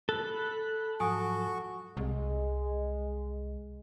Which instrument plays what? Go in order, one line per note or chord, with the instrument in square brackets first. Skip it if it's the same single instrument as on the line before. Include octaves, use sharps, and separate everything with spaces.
[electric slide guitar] A4 [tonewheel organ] B5 F#6
[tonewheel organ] G#2 F3 F#3 [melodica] F#4 C#6 [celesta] G#5 D#6
[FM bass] C2 [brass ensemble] G#3